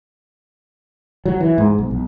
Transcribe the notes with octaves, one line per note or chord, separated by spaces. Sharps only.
F#3
E3
G#2
B1
B1